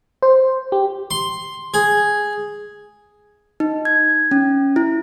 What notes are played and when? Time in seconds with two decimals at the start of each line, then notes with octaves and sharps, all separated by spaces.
0.22 C5
0.72 G4
1.11 C6
1.74 G#4
3.60 D#4
3.85 G#6
4.31 C#4
4.76 E4